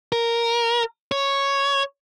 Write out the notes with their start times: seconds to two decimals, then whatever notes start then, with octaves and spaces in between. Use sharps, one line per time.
0.12 A#4
1.12 C#5